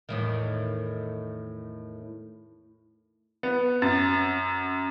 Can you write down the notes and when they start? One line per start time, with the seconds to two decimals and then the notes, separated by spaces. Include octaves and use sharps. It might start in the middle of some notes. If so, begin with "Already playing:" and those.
0.09 E2 A2 D#3
3.43 B3
3.82 F#2 A6